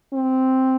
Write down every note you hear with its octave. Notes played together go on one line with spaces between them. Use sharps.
C4